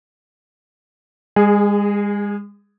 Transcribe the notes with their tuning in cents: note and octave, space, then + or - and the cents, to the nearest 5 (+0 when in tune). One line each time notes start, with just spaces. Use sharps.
G#3 -35 G#4 +0